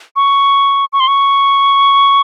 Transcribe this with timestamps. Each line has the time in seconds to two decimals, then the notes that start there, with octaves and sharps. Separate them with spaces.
0.16 C#6
0.93 C#6
1.00 C6
1.08 C#6